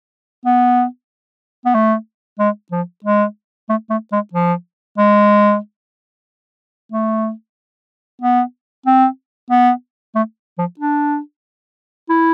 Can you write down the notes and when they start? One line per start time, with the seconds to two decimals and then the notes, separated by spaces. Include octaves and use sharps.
0.45 B3
1.65 B3
1.75 A3
2.39 G#3
2.72 F3
3.04 G#3
3.69 A3
3.90 A3
4.12 G#3
4.34 F3
4.98 G#3
6.92 A3
8.22 B3
8.86 C4
9.51 B3
10.15 A3
10.58 F3
10.79 D4
12.09 E4